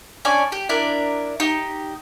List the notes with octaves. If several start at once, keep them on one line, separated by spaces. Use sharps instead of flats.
C#4 D4 D5 G#5
G4
D4 E4 A#4 D5
D#4 G4